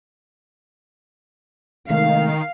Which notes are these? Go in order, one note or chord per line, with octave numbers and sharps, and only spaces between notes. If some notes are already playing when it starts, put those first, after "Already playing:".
C3 D#3 G#3 A3 F5